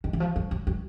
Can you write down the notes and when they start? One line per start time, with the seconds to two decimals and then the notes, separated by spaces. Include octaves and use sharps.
0.04 D#3
0.13 E3
0.20 F3
0.36 F#3
0.51 F#3
0.67 F#3